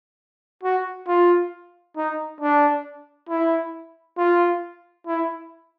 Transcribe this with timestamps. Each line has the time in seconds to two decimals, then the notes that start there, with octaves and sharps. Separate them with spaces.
0.63 F#4
1.08 F4
1.97 D#4
2.41 D4
3.29 E4
4.18 F4
5.07 E4